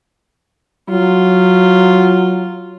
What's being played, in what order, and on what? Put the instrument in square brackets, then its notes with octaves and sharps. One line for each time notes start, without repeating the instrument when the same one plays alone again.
[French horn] F#3 [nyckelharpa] F4